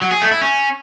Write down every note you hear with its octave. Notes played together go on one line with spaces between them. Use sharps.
F#3
G#4
A3
E4
C#4